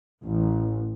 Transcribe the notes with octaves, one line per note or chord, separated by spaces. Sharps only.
A1